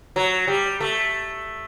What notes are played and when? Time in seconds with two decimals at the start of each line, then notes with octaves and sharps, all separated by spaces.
0.16 F#3
0.48 G3
0.80 A3